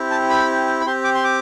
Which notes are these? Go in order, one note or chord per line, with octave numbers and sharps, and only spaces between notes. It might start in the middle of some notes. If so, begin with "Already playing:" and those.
Already playing: C4 E4 G4
A5
B5
B5
C4 G4 C6
D6
C6
D6